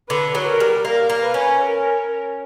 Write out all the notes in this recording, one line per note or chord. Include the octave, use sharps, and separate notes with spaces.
D3 B4
F#3
A#4
G3
A#3 A#4
A#3
B4
C#4
A#4